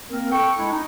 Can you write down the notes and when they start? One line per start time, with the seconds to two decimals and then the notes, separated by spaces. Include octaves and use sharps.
0.10 A#3 C4 A#4
0.32 A4 G5 C#6
0.58 G#3 D4 E4
0.72 D#4